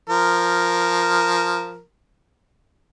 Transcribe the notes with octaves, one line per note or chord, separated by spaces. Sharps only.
F3 A#4